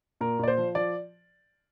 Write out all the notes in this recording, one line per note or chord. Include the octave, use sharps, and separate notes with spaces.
A#2 A#4
A#2 D5
C5
F3
F3 D5